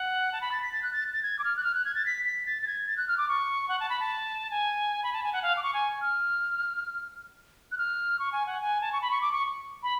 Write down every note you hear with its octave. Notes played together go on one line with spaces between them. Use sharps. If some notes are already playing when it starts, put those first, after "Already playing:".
Already playing: F#5
A5
B5
A6
B6
A6
F#6
A6
A6
G#6
D6
F6
F#6
F6
F#6
G#6
A6
B6
B6
A6
A6
G#6
A6
F#6
F6
D6
C#6
F#5
A5
B5
A5
G#5
B5
A5
G#5
F#5
F5
D6
C#6
G#5
F6
F#6
F6
C#6
G#5
F#5
G#5
A5
C#6
B5
C#6
D6
C#6
B5